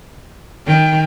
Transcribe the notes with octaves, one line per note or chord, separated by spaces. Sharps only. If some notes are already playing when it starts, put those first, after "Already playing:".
D#3 G5